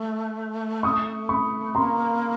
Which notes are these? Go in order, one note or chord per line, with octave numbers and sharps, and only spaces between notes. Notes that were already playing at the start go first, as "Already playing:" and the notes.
Already playing: A3
C#6 D#6
B5 C#6
A#3 A#5 C6